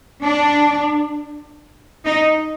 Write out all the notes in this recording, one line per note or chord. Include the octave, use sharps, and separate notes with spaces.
D4
D#4